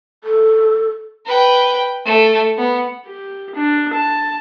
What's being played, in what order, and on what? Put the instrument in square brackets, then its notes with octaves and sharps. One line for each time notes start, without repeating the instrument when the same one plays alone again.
[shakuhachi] A4
[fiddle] B4 G5
A3
B3
[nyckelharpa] G4
D4
A5